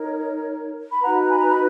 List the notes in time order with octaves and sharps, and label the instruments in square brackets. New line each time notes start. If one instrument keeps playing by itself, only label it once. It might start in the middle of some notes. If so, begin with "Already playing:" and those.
Already playing: [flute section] D#4 A#4 C#5
B5
D#4 F#4 B4 F#5 A#5
A#5
G#5 B5
A#5
B5